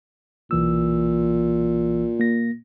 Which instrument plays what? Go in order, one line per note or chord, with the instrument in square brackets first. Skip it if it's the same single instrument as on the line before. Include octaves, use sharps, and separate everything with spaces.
[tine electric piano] B1 E3 E6 [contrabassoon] A#2
[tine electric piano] A#3 A#6